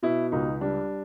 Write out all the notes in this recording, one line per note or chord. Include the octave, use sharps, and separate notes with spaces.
B2 E4
C#2 D#4
G3 D4